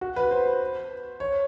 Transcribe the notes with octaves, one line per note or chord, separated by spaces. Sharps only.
F#4
B4
C5
C#5